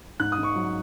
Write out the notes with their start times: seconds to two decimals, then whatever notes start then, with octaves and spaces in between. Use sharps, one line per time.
0.20 G#2 F#6
0.32 D#6
0.38 G#2
0.43 C#6
0.56 F#3